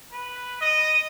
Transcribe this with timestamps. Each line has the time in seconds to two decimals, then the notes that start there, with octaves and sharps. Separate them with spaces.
0.12 B4
0.61 D#5